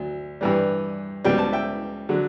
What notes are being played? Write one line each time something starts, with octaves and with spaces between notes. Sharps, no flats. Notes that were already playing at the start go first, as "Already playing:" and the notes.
Already playing: D2 F#3
G2 E3 G3
C#2 B2 G3 G5
A5
E5 G5
D3 F#3